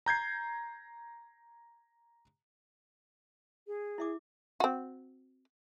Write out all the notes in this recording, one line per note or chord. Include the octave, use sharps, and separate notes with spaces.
A#5 G6 G#6 C7
G#4
E4 E5 D6
C4 F#4